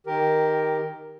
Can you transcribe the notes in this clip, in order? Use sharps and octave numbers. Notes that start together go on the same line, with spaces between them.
D#3 G4 A#4